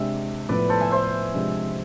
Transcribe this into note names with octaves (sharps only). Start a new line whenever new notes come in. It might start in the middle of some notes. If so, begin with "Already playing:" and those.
Already playing: C3 G#3 D4 E5
A2 F3 B3 B4 D5
A4 C5
E5 G#5
C5 E5
C3 F3 G#3 D4